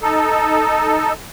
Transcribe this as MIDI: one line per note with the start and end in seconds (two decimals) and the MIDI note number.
0.01 1.13 63
0.01 1.13 69